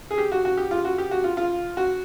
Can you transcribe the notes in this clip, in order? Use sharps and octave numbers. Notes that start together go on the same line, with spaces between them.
G#4
G4
F#4
F#4
G4
F4
F#4
G4
F#4
F4
F4
F#4